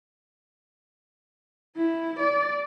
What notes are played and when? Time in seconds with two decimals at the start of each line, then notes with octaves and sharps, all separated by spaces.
1.77 E4
2.19 D5